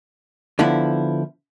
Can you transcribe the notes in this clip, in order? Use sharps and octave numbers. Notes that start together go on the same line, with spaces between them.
D3 F3 B3 E4